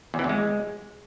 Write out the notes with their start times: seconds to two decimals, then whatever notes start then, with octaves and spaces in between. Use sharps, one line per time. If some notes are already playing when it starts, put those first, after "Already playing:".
0.14 E2
0.19 E3
0.24 E2
0.29 G#3